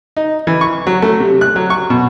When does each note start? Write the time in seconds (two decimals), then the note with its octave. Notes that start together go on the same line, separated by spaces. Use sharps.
0.17 D#4
0.47 E3
0.61 C#6
0.87 F#3
1.02 A3
1.20 C3
1.41 F#6
1.56 F#3
1.70 C#6
1.90 B2